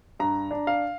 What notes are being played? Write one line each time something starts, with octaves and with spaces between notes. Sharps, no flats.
G2 A#5
D4
F5